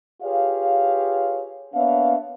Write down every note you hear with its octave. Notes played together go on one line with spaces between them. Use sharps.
F4 G4 G#4 B4 C#5 F5
A#3 B3 D4 C#5 E5 F5